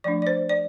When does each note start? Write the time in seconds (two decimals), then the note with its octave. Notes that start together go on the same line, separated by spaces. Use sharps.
0.04 F3 A3 D4 D5
0.22 D5
0.27 C5
0.49 D5